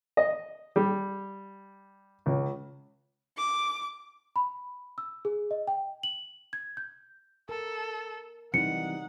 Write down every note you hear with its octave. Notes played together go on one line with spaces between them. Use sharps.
D#5
G3
C#2
D6
B5
E6
G#4
D#5
G5
F#7
G#6
G6
A4 A#4
C3 E3 F#3 G3 D#4 F#5 C#7